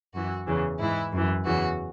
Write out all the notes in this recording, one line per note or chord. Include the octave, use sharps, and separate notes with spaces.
F#2 E3 F#4
E2 C#3 E3
G#2 E3 E4
F#2 E3
E2 C#3 E3 F#4